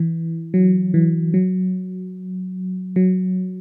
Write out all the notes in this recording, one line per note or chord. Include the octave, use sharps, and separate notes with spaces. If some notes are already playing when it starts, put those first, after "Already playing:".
Already playing: E3
F#3
E3
F#3
F#3